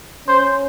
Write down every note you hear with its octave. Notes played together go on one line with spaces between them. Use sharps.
C#4 C5